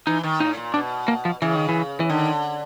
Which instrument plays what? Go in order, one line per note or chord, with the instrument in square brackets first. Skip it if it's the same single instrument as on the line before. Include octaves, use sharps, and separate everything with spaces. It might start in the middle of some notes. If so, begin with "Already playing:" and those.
[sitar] E3 [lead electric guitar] D#4
[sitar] D#3
[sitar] A2 [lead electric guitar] D#4
[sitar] A#2
[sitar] B2 [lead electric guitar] D4
[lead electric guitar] A#3
F3
[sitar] C#3 [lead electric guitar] E3
[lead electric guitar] D#3
E3
E3
[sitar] D3 [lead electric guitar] D#3